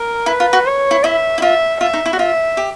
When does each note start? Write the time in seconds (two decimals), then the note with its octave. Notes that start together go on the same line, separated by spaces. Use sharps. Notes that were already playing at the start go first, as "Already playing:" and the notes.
Already playing: A#4
0.26 E4 B4
0.40 F4
0.53 F#4
0.66 C#5
0.91 E4
1.04 E4 E5
1.38 E4
1.42 F4 E5
1.80 F4 E5
1.93 D#4
2.06 E4
2.13 F#4
2.19 F4 E5
2.57 G4